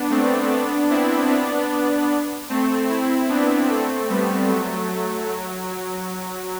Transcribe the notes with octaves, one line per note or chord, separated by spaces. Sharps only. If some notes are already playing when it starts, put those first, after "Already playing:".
Already playing: B3 D4
A3 C4
B3 D4
C4 E4
B3 D4
A3 C4
C4 E4
B3 D4
A3 C4
G3 B3
F#3 A3
F#3
F#3
F#3